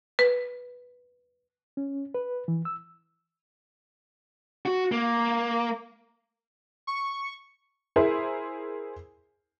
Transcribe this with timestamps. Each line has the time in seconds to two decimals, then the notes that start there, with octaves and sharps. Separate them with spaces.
0.19 B4
1.77 C#4
2.14 B4
2.48 E3
2.65 E6
4.66 F#4
4.92 A#3
6.87 C#6
7.96 E4 G#4 A#4 C5